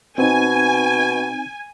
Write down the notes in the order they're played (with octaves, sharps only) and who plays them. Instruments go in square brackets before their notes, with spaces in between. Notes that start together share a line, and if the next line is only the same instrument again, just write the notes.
[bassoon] B2 [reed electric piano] C4 D#4 [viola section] G#5